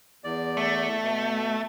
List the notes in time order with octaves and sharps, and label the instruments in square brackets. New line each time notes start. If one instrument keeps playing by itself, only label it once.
[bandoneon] E2 D5
[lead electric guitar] A3
[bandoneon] B2